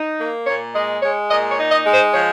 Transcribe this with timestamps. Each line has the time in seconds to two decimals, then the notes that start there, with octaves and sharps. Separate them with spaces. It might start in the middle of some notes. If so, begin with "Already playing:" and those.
Already playing: D#4
0.20 A#3
0.47 A#2 C#5
0.75 G#3 D#5
1.02 G#3 C#5
1.30 A#2 D#5
1.51 C#5
1.58 D#4
1.72 D#5
1.86 G#3
1.93 C5
2.14 F3 C#5